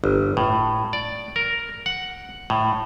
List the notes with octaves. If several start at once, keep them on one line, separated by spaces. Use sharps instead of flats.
G1
A2
D5
A#4
F#5
A2